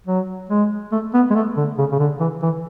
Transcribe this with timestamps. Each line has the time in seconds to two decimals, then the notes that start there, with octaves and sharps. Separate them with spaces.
0.07 F#3
0.50 G#3
0.92 A3
1.14 B3
1.30 G#3
1.35 A3
1.57 D3
1.78 C#3
1.92 C#3
1.99 D3
2.20 E3
2.42 E3